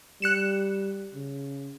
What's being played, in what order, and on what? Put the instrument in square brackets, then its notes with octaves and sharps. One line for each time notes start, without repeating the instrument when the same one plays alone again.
[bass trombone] G3 [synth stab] F#6 C#7 E7
[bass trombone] C#3